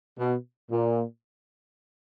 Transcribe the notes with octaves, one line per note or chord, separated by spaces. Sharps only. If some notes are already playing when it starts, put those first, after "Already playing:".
B2
A#2